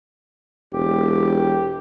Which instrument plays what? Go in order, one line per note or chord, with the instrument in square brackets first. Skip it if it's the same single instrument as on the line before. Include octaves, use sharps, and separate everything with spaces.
[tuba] E1 [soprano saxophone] G4